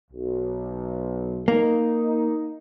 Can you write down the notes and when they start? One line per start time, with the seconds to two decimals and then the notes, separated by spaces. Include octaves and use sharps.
0.11 B1
1.48 A#3 D#4